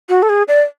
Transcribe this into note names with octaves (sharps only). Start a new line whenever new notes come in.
F#4
A4
G#4
D5